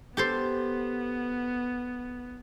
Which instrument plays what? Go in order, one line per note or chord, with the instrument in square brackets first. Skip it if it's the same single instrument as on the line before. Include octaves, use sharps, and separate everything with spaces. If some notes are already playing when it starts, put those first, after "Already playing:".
[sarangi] B3 [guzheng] G4 A4 C5